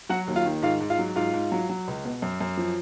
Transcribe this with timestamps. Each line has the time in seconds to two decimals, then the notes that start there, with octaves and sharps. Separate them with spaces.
0.09 F#3 F#4 F#5
0.27 D#2
0.36 F4 F5
0.45 D#3
0.62 G#2 F4 F5
0.80 G#2
0.90 F4 F5
0.99 F#3
1.16 G#2 F4 F5
1.34 G#2
1.52 F#3
1.69 F#3
1.88 C#2
2.05 B2
2.22 F#2
2.41 F#2
2.57 F3